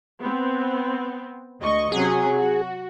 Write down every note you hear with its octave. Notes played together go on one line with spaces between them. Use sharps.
B3 C4
D2 D#5 C#6
C3 F#3 C#4 G#4
F#4